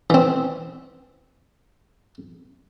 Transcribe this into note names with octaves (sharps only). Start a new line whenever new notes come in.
E3 C4